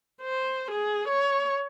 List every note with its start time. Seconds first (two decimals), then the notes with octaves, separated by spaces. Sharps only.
0.21 C5
0.71 G#4
1.08 C#5